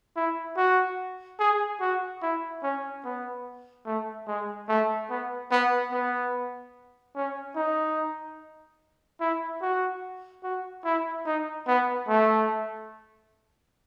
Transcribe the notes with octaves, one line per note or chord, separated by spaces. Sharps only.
E4
F#4
G#4
F#4
E4
C#4
B3
A3
G#3
A3
B3
B3
B3
C#4
D#4
E4
F#4
F#4
E4
D#4
B3
A3